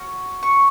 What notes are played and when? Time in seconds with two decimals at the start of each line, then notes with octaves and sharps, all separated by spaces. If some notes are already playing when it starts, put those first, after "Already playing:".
Already playing: C#4 F#4
0.43 C#6